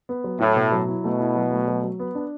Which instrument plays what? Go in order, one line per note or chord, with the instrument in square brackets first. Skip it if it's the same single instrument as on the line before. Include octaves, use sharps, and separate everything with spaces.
[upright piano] B3
F#3
[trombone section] A2 [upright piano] E4
[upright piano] B2
F#3
E4
[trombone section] B2 [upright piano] A3
[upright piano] E4
F#3
A3
F#3
F#3
B3
D4